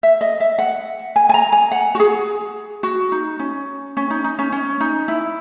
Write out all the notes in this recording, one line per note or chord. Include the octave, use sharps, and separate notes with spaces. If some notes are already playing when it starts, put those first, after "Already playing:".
E5
D#5
E5
F#5
G#5
G#5
A#5
G#5
F#5
F#4
G#4
F#4
D#4
C#4
C#4
D#4
D#4
C#4
C#4
D#4
E4